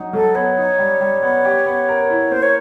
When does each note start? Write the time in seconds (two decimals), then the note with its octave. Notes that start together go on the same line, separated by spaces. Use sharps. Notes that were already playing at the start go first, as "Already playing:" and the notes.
Already playing: F#3 D#4
0.13 F#3 A4
0.35 B3 C#5
0.58 D#4
0.79 G3
1.01 G3
1.22 B3
1.45 G4
1.66 B3
1.89 A#4
2.10 E4
2.31 A#3 C5
2.43 C#5